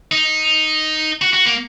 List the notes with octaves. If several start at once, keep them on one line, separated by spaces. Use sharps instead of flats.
D#4
F#4
F#4
A#3